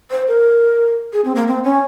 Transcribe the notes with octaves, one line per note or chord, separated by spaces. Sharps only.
C5
A#4
G#4
C4
A#3
C4
C#4